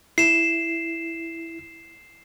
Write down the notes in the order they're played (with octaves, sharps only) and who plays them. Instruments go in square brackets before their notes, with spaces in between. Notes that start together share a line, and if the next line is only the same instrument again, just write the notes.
[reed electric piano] E4 [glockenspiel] C7 E7